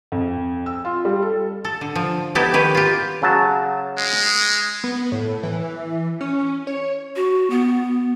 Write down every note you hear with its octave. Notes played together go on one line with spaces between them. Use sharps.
F2
E6
F4
G3
A4
A4
D3
F3
B3 D#4 E4 G4 A4
D#3 G4 B4 C#5
F4 G4
C#3 F#3 A5
G#3
B3
A2
E3
C#4
C#5
F#4
B3